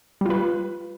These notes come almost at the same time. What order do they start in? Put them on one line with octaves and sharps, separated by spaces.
G3 F4 B4